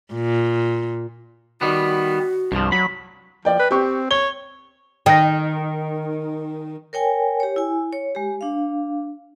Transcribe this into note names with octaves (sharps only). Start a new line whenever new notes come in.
A#2
D#3 G3 B3 F#4
C2 G2 F3
F#3 B5
F3 D5 G5
B4
C4 G4 C#6
C#5 G7
D#3 G5 A#6
A#4 C#5 G5 G#5
G4 C#5
E4 G#5
C#5
G#3 G4
D4 F5